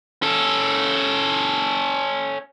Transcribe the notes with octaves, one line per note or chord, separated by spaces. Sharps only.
C#4 A4